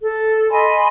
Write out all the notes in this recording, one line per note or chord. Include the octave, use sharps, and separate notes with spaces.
A4
D#5 G#5 B5 C6